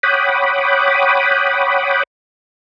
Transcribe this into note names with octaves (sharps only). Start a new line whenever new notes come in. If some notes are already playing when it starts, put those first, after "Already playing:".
C#5 F#5 G5 B5 D6 D#6